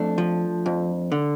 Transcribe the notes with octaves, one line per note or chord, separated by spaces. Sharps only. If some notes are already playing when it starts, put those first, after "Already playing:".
Already playing: F2 A3 D4
F3
F2
D3